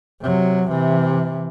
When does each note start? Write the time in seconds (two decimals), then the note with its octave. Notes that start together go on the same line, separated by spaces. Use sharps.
0.21 C3 F#3
0.69 C3 E3